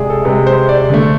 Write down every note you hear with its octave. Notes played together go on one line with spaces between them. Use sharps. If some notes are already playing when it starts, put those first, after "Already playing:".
Already playing: C3 G#3 G#4 D5 E5
A4
C3 G#3 B4
C5
D5
D3 A3